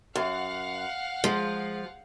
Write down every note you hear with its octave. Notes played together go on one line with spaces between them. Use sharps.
F#2 F5 F#5
F3 G#3